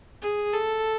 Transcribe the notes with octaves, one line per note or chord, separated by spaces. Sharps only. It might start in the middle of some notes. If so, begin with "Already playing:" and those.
G#4
A4